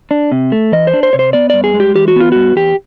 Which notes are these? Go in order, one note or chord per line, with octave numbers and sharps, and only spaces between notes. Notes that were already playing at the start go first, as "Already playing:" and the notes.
D4
C3
A3
E3 D#5
C5
D4
C5
C3 C#5
C5
B3 D5
G2 D5
G#4
G#3
G4
E3 G4
F#4
B3 F4
G2 F#4
E2 G4